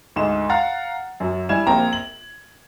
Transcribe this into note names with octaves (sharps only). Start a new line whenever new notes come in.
D2 G#2 D#4 E7
F5 F#5 A#5 A6
F#2 F#3
G3 E4 G#5 G#6 E7
A#1 A#3 C4 A#4 G5 A#5
F#7